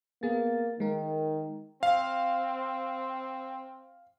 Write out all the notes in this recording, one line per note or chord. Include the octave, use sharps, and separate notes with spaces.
A#3 B3 G#4 A6
D#3 G#3 A#4
C4 F5